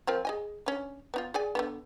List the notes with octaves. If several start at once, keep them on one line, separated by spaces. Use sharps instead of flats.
F3 C4 A#4
G#4 D#5 G#5
C#4 D4
B3 D#4 F4
G#4 D5 G#5
D3 D#3 B3